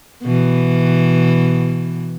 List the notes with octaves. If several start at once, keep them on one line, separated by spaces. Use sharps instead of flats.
B2 E3